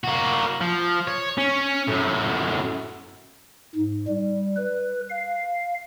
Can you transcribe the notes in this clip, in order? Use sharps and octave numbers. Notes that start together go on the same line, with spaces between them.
A#3 F#4
F3
C#5
C#4
F#2 A2
G#2
G3
B4
F5